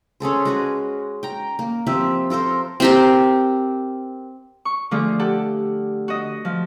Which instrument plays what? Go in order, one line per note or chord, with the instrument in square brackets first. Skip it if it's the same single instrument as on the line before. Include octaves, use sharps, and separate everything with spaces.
[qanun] C#4 G#4 A4 C5
G#3 F#4 B4
G5 A#5
A#3
F3 C4 G4 E5
F4 A4 A#4 C5
C4 G4 A#4
[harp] C#6
D3 F3 A3 F4 G#4
G4 A4 F#5
F#4 D#5
F3